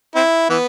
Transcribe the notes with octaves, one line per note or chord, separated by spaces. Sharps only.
C4 E4
E3 B3